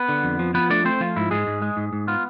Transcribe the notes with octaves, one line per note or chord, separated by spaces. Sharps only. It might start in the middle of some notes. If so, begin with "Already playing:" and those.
Already playing: B3 B4
D3
F2
F3
F3 B3 B4
A3 D4 D5
A3 C4 C5
F3 F4
G#2 E4
G#2 G#3 G#4
G#2
G#3
G#2
G#2
B3 F4